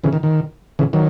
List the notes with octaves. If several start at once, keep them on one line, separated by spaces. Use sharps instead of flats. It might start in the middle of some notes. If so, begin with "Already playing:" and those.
C#3 E3
D#3
D#3
C#3 E3
D#3 F#3